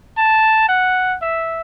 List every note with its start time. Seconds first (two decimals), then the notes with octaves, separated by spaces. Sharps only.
0.17 A5
0.69 F#5
1.22 E5